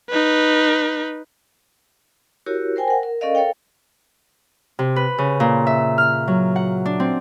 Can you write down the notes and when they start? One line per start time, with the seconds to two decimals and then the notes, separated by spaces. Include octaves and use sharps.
0.10 D#4 B4
2.46 E4 F#4 G4 A#4 C#5
2.76 A#4 C5 G5 G#5
2.88 A#4 F#5
3.03 A#4
3.21 C#4 A4 A#4 D5 D#5 F5
3.35 A4 A#4 C#5 F5 G5
4.79 C3
4.96 B4
5.18 C#3
5.40 A#2
5.67 E5
5.98 F6
6.28 F#3
6.56 F#5
6.85 D4
7.00 C4